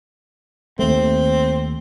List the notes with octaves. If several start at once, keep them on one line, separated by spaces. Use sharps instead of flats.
D#2 A3 C4